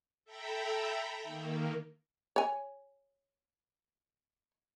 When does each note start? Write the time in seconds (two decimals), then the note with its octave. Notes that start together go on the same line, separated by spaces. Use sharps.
0.25 A4 E5 G5 A#5 B5
1.23 D#3 A#3
2.36 C#5 G#5